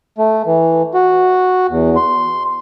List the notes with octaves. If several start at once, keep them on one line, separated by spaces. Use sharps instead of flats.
A3
E3
F#4
E2
C6